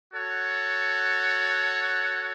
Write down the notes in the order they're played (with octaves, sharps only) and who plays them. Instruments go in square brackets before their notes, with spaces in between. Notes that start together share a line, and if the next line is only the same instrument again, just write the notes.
[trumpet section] F#4 A4 C#5 F#5